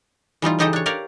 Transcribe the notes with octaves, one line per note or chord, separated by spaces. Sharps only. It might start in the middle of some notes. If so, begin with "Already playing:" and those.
E3 G3 D#4 F4
C#3 E3 D#4 G4 A4 D#5
D4 C#5
G4 A#4 C#5 D5 F5